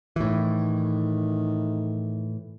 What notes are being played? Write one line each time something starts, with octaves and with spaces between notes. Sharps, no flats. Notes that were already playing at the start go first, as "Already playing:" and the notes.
A2 D#3 E3